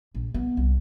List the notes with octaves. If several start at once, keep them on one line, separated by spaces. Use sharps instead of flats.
A#1
B3
C2